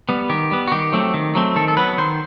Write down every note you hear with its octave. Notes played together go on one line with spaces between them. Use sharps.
G3 B3
D#3 G4
G3 B3
F#4
D#3 G4
F#3 A3 C4
D#3
F#3 A3 C4
D#3 A4
A4
F#3 B3 B4
D#3 C5